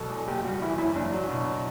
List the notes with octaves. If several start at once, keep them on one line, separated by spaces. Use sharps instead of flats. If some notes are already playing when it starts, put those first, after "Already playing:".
Already playing: E1 B2 F#3 A4
E2
F#1 G4
G3 F#4
E3 E4
F#2 E4
F#1 D4
F#3
B2